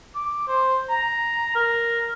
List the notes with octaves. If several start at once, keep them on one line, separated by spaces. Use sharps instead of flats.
D6
C5
A#5
A#4